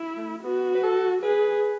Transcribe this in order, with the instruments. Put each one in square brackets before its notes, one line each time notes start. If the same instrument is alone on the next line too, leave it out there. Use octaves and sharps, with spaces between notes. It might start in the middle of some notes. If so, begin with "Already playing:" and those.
Already playing: [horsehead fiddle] E4
[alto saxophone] A3
[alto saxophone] B3 [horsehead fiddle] F#4
[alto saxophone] B4
A4
[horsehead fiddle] G#4 [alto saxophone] B4